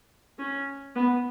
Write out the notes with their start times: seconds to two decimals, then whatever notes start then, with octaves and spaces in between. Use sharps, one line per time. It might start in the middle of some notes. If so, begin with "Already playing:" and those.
0.39 C#4
0.96 B3